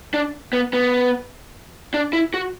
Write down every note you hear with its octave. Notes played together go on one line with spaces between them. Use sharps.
D4
B3
B3
D4
E4
F#4